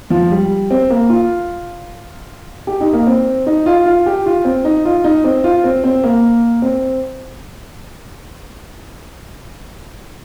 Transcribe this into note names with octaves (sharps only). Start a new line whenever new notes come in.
F3
G3
C4
A#3
F4
G4
D#4
A#3
C4
D#4
F4
F4
G4
F4
C4
D#4
F4
D#4
C4
F4
C4
C4
A#3
C4